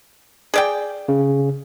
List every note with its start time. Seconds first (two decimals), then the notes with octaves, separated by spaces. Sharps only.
0.54 G#4 D5 G5
1.08 C#3